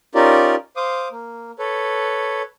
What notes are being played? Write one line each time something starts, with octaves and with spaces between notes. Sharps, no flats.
C#4 D#4 F4 G4 A#4 D5
C5 F5 D6 D#6
A#3
A4 B4 C#5